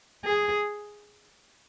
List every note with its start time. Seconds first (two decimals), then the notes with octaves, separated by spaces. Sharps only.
0.25 G#4